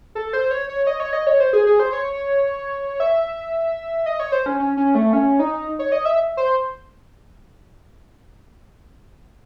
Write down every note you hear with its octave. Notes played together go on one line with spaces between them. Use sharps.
A4
C5
C#5
C#5
D#5
C#5
D#5
C#5
C5
G#4
G#4
C5
C#5
E5
D#5
C#5
C5
C#4
C#4
C#4
A3
C#4
D#4
C#5
D#5
E5
C5